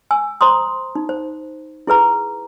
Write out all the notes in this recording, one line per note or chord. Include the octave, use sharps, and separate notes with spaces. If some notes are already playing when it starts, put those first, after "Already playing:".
G#5 E6
C5 A#5 C6 D#6
D#4
C5
E4 G#4 B4 A#5